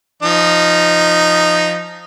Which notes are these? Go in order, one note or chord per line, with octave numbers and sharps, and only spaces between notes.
F3 D#4